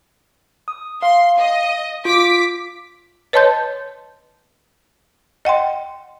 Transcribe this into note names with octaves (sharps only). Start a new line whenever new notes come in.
D#6
F5 C6
D#5
F4 D6 B6
B4 C#5 D#5 A5 C6 G6
D#5 F#5 G5 C6